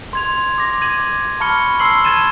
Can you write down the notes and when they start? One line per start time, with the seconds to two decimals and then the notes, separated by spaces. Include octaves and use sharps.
0.13 C6 G#6 F7
0.58 D6 A#6
0.81 D6 G#6 D#7 F#7
1.40 A5 B5 C#6 F6 C#7 G7
1.79 A5 C6 E6 C7 F#7 G7
2.04 A5 G#6 A6 D#7 E7 G7